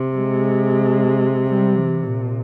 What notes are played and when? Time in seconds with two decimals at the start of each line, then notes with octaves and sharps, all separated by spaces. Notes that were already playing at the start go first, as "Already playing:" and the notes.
Already playing: C3
0.15 G#3
1.47 G3
1.77 E3
2.05 A#2